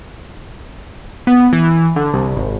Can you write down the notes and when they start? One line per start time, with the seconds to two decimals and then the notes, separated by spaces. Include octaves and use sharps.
1.27 B3
1.53 E3
1.96 D3
2.14 C2
2.36 G#1